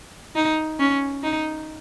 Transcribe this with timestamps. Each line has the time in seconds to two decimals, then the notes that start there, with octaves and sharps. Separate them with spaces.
0.35 D#4
0.79 C#4
1.23 D#4